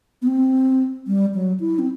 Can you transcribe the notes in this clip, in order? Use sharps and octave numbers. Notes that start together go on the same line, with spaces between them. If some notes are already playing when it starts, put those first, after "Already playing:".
B3
C4
G3
F#3
E4
C4